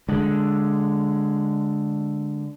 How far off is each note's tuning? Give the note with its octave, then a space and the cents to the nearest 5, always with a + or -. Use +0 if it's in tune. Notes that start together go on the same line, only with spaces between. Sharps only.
D3 +0 G#3 +0